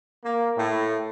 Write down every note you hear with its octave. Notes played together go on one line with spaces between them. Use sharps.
A#3
A2